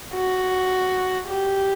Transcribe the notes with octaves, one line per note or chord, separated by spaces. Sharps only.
F#4
G4